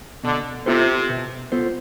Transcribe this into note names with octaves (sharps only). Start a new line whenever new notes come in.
B2 D3
C3 B3 F4 A4 C5
B2
B3 F4 A4 C5